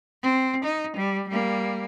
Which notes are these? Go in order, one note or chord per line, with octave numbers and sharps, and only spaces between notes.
C4
D#4
G3
G3 A#3